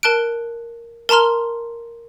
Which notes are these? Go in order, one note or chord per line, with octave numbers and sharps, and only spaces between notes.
A#4 A5 F#6 D7
A#4 A5 A#5 C6 F6